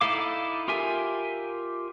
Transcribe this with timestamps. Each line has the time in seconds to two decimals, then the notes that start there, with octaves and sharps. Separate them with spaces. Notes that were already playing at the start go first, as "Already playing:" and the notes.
0.01 D#4 E4 A4 F5 D6
0.68 F4 G4 A#4 E5 G#5